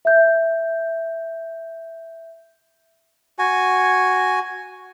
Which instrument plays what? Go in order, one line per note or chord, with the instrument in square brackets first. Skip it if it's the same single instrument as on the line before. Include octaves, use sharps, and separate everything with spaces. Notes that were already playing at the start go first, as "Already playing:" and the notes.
[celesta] E5 G6
[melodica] F#4 G#5